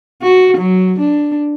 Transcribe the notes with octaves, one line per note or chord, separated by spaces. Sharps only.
F#4
F#3
D4